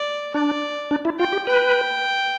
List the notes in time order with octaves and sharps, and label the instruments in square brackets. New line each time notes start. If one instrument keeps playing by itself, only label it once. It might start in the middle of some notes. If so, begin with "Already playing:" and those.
Already playing: [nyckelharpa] D5
[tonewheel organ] D4 [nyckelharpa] D5
[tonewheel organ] D4
E4
[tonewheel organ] F4 [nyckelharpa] G5
[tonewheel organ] G4
[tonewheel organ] B4 [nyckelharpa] G5